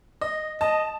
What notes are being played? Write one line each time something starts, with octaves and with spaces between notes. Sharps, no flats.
D#5
D#5 A5